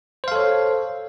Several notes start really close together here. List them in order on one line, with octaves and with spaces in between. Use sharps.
C5 F5 A4 C#5